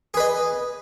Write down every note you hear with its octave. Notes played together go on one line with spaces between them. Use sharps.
G#4 B4 D#5